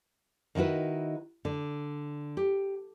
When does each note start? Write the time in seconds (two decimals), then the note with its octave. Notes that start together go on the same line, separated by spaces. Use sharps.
0.55 D#3 D#4 E4 F#4 B4
1.45 D3
2.37 G4